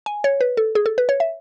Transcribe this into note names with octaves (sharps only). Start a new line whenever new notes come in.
G#5
C#5
B4
A4
G#4
A4
B4
C#5
E5